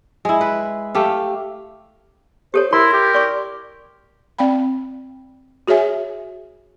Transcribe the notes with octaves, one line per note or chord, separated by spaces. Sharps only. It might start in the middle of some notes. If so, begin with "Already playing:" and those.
G#3 E4
B4
A3 G4 F5
G4 A4 C5 C#5
E4 A#4 C6
G4
D5 C#6
C4 D5 F5 G5 B5
F#4 G#4 C#5 E5 G#5